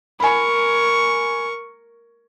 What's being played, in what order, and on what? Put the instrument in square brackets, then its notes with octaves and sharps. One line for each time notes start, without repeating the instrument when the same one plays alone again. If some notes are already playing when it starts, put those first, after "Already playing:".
[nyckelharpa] A#4 C#6 [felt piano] G#5 B5